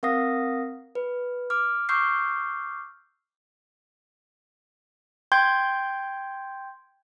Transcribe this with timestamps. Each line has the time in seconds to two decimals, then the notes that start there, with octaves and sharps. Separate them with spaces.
0.03 C4 A#4 F5 F#5 D#6 A#6
0.95 B4
1.50 D6 F6
1.89 C#6 D6 E6 F6 G6 C7
5.32 G5 C6 G6 G#6